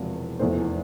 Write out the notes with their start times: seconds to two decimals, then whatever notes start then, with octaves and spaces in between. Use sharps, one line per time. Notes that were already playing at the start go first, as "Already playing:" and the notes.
Already playing: E1 E2 C3 F3
0.39 F1 E2 E3 A3 C5